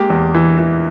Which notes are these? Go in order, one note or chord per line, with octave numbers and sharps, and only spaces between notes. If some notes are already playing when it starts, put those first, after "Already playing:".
Already playing: G#3 A#3 G4
E2
E3
E3